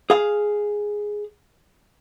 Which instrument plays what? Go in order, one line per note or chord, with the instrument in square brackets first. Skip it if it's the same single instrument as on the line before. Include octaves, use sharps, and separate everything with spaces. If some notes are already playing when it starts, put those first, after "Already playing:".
[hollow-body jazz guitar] G#4 F5